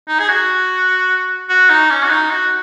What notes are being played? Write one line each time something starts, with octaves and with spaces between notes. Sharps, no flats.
D#4
G#4
F#4
F#4
D#4
C#4
F#4
D#4
F#4